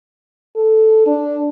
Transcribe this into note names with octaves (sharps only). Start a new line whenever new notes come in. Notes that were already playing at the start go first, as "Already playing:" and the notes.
A4
D4